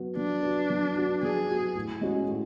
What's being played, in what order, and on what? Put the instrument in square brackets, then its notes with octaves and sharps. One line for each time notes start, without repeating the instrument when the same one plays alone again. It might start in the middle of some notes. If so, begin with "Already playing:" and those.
Already playing: [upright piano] F#3 B3 F#4
[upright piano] F#3 [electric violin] D4
[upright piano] B3 F#4
F#3
B3 F#4
[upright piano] F#3 [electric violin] G#4
[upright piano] B3 F#4
A2
G#3 C#4 F#4
A2